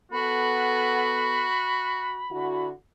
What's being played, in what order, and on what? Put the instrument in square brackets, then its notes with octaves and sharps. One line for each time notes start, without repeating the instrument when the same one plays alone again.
[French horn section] B3 A4 [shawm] F#4 [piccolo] B5
[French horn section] D3 E4 F#4